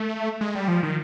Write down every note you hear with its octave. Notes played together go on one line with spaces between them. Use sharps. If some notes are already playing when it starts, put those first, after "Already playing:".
Already playing: A3
G#3
G3
F3
D#3